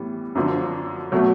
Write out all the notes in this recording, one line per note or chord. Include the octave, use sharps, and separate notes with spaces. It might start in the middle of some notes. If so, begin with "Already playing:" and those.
Already playing: A2 E3 G3 B3
F#2 D3 F3 A#3
B2 F#3 A3